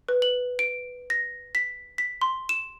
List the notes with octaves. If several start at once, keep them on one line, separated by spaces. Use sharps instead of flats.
B4
F#7
D7
A#6
B6
B6
C6
E7